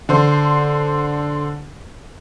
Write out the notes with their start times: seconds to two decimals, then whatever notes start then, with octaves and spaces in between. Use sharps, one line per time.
0.09 D3 C5